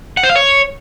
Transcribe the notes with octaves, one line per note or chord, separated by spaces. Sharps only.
F#5
C5
F5
C#5